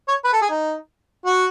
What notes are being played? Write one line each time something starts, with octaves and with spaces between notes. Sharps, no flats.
C#5
B4
A4
G#4
D#4
F#4